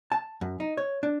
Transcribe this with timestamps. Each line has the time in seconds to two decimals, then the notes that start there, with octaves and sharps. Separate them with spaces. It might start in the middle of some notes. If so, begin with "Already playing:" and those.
0.12 A5
0.41 F#2
0.60 D#4
0.77 C#5
1.03 D4